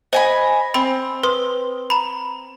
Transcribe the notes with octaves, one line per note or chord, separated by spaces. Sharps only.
C5 D#5 G#5 B5
C4 B5
B4 C6 D#6
A#5 B5